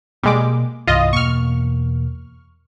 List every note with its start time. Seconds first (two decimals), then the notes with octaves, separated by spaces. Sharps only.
0.23 B2 G3 G#3 A#3 D6
0.87 C2 G2 E3 F4 D#5
1.13 E2 B2 A#3 C#6 F6